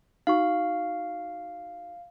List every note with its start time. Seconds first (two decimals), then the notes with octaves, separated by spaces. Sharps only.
0.27 D#4 F#4 F5 C#6